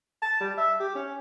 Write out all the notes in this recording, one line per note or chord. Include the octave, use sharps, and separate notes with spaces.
A5
G3
E5
G4
C#4